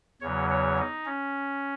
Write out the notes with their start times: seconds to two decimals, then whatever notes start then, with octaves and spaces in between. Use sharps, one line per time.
0.21 E2 C#3 F#3 C#5
0.50 C#5
0.79 D#4
1.06 C#4